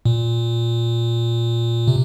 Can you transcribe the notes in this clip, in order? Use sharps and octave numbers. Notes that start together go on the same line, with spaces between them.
A#2
C3